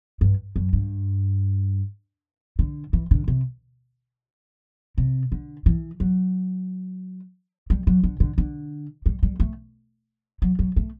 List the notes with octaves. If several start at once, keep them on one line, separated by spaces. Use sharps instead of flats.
G2
F#2
G2
D3
E3
D3
C3
C3
D3
E3
F#3
G3
F#3
D3
D3
D3
G3
G3
A3
F#3
F#3
A3